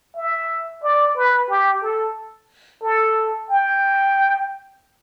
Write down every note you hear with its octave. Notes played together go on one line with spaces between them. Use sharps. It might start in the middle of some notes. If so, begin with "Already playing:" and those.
E5
D5
B4
G4
A4
A4
G5